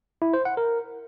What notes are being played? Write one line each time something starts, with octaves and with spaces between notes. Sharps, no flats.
E4
C5
F#5
A#4